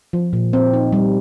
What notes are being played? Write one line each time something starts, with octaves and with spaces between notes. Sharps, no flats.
F3
A#2
C4
D#4
G3